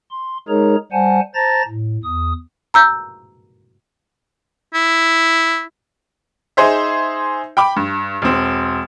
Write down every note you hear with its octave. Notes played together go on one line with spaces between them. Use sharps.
C6
G#3 D#4 G#4 A#4 C#5 A#5
G3 C5 F#5 G#5 A5
C5 A5 A#5 A6 A#6
A2
E2 D#6
A#5 E6 G6
E4
D#4 G#4 C5 E5
G5 B5 D6
G2
E1 C4